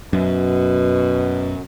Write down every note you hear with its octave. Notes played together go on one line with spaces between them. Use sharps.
F#2 B2